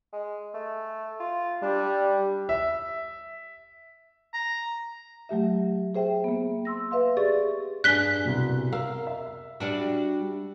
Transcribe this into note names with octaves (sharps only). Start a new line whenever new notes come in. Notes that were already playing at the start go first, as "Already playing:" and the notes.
G#3
A3
F4
G3 D4
E5
A#5
F#3 A3 G4 E5
G#4 C5 E5 G5
A#3 B3
C6 E6 A#6
B4 E5 F5 C6
G4 G#4 D5 C#6 A6
G2 D4 G#4 F#6 B6 G7
C2 B2
A#4 F5 E6
E5
G3 D4 F#4